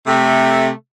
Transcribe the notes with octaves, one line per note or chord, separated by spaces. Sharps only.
C3 A3